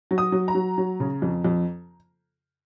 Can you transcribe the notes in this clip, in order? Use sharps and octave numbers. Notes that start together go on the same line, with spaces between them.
F#3
D#6
F#3
A#5
F#3
F#3
C#3
F2
F2